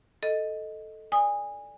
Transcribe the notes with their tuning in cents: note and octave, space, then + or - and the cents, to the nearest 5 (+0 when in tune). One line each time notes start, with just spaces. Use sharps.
A4 +0 D#5 +0
D5 +0 G#5 -20 D#6 +0